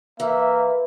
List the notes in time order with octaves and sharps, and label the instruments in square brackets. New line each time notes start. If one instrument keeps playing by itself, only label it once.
[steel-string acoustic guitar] E3 [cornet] A#3 [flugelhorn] E5